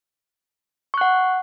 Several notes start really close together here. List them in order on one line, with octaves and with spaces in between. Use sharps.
C#6 F#6 F#5